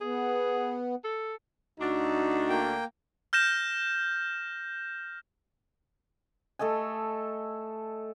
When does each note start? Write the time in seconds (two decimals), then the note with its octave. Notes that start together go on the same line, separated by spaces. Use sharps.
0.01 B3 G#4
1.04 A4
1.80 D2 D4 D#4 F#4
2.50 A#3 G5
3.33 F6 G6 A#6 E7
6.59 A3 A4 D#5 G#5